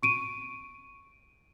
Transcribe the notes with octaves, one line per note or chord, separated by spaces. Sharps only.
C#6 D7 D#7